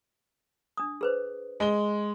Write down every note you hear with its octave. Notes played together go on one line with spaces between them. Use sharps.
D4 D#6
G#4 B4 C5
G#3 G7